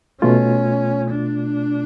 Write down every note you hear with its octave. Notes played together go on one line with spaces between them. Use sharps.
B2 A3 C#4 F4
D4